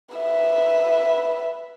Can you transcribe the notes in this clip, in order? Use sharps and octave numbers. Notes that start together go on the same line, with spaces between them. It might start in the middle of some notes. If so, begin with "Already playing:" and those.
B4 E5